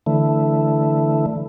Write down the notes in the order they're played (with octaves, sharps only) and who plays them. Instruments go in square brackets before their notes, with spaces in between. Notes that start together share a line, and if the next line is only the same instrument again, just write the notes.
[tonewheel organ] D3 E3 A3